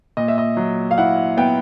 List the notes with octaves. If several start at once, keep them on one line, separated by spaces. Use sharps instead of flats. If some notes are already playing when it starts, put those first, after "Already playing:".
A#2 D#5
E5
D#5
F#3
F5
E4 F#5
B3 G5